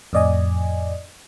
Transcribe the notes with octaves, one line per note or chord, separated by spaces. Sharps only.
F2 A2 D5 D#5 G#5